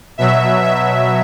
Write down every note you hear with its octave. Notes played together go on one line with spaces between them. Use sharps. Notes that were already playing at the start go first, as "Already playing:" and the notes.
B2 F#3 E5
E5